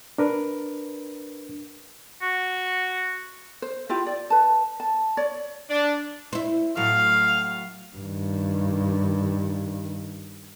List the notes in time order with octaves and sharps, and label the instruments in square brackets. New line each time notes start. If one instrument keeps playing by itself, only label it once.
[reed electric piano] D4 A#4 B4
[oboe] F#4
[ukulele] C5
E4 F4 G4
D5
B4 A5
A5
C#5 D5
[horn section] D4
[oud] E4 C5
[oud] A2 F#3 [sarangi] F5
[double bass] G2 D#3